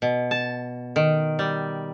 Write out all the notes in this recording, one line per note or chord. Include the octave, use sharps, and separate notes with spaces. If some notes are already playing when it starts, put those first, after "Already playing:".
B2
A5
D#3
G3